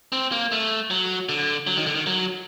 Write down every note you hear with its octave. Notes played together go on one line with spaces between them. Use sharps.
C4
A#3
A3
F#3
D3
F#3
D#3
D3
D#3
F#3